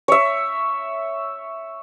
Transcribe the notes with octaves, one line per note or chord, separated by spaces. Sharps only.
C#5 E5